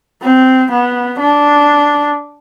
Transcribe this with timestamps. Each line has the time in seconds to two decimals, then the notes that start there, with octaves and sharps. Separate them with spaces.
0.22 C4
0.71 B3
1.20 D4